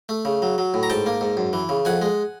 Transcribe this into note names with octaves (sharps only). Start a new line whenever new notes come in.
A3
C#3
F#3
F#3
A2
A#5
G#2 G5 A5
A#3
G#2
F#2
E3
C#3
F2 F#5 G#5
G#3